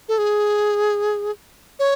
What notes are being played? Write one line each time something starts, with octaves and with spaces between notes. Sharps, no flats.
A4
G#4
C#5